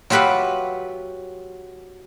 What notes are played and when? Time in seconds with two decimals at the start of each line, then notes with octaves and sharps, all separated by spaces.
0.10 F#3 F4 G4 B4 E5 F#5